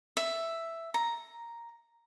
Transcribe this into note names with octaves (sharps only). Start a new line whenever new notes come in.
E5
A#5